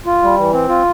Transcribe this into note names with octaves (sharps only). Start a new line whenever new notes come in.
F4
G3
E3
C4
F4